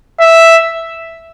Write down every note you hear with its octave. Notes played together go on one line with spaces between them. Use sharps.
E5